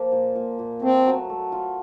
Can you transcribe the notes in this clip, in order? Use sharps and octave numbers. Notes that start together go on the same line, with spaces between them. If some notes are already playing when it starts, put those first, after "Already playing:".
Already playing: F3 A#3 F4
A#2
A#2
A#2
A3 C4
F#3
A3
F4